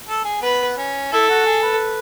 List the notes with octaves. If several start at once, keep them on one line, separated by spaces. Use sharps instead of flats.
A4
G#4
B3 B4
C#4
E4 A4
F#4
G#4
B4